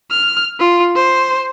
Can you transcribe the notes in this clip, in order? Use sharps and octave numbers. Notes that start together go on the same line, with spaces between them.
F6
F4
C5